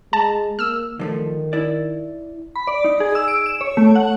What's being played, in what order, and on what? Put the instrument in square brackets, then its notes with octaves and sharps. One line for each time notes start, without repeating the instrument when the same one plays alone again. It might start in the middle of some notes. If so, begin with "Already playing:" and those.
[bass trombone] G#3 [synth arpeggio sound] A5 A#5
[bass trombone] A#3 [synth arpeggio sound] E6 F6
[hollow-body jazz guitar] D3 F3 A3 [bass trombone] D#3
[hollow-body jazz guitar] E4 D5
[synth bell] B5
D5
D#4
G#4
E6
D7
E7
C#5
A3
F#5